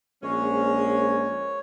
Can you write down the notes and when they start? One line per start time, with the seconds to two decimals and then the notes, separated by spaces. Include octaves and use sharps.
0.23 A#1 G#3 C#4 C#5